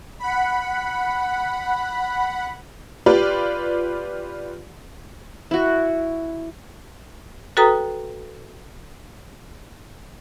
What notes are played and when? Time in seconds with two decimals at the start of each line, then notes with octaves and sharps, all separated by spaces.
0.19 F#5 B5
3.06 F4 G4 B4 D5
5.51 E4 F#4
7.57 F#4 A4 B4 G5 A#5 D#6